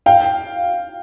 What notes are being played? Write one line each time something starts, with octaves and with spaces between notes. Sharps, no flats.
F5 G5